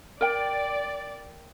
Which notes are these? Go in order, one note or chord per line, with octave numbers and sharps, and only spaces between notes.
A#4 D5 G5